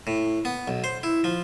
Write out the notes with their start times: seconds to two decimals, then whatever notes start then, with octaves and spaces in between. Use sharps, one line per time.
0.07 A2
0.45 B3
0.68 B1
0.84 C5
1.03 E4
1.24 F3